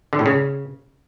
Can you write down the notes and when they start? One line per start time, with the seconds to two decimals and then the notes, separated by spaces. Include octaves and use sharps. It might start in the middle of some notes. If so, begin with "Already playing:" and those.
0.13 D3
0.19 A2
0.26 C#3